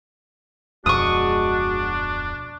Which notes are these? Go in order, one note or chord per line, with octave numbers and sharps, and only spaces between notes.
D1 F2 B2 G#3 D4 F#4 C#6 D#6